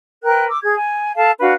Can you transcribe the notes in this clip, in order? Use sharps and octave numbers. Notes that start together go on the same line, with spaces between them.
A#4 B4 G5 F#6
D6 E6
G#4 G#6
G#5
A4 F5 A5
D4 F#4 B4 F5